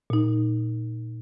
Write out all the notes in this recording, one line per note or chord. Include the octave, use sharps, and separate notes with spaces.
A#2 D#4